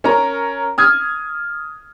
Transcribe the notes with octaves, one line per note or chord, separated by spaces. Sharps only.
C#4 A#4 A#5
D#6 F6 G#6